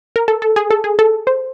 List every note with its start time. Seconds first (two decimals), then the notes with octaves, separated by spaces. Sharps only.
0.16 A#4
0.28 A4
0.42 A4
0.56 G#4
0.71 A4
0.84 G#4
0.99 A4
1.27 C5